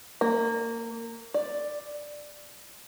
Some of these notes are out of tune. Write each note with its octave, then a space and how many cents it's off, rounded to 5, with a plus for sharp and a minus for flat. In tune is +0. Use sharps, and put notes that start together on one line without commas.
A#3 -20
D5 +5